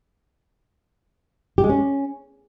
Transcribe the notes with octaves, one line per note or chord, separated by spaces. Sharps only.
G4
G#3
C#4